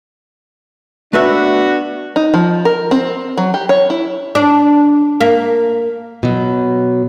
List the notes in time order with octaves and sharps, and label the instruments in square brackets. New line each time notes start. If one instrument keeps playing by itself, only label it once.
[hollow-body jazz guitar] A3 B4 E5 [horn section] B3 D4 F#4
[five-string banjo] D#4
F3
A#4
C4
F#3
G4
C#5
E4
[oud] D4
A#3
[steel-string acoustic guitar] B2 F#3